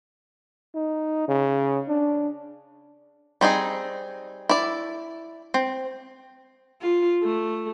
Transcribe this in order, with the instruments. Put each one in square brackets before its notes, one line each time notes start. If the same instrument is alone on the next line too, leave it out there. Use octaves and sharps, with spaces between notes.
[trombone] D#4
C#3
D4
[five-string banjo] G3 C4 D#4 G#4
E4 D5
C4
[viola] F4
A3